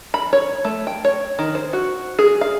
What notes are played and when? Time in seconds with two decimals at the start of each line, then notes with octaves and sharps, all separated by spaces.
0.14 B5
0.33 C#5
0.65 A3
0.87 G5
1.05 C#5
1.39 D#3
1.55 C5
1.73 F#4
2.19 G#4
2.41 F5